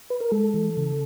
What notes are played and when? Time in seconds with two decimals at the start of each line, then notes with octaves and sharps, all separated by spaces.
0.10 B4
0.20 A#4
0.31 G#3 A4
0.54 E3
0.77 C#3